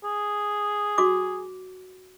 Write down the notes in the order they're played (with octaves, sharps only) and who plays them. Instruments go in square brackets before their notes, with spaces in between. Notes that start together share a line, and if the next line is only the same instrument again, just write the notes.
[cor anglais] G#4
[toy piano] F#4 D6